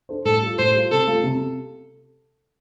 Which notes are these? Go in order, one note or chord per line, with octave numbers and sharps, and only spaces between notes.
D4 A4 C5
A2 A4
G3 F4
A2 C5
G3 F4
C3 A4
A3 F4
C3